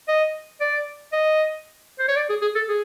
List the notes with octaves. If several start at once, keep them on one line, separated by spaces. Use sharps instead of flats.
D#5
D5
D#5
C5
C#5
D5
G#4
G#4
A4
G#4